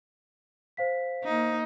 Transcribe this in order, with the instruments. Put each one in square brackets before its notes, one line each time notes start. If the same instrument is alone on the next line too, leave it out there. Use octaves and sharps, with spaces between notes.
[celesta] C5 F5 B6
[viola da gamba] A#3 D#4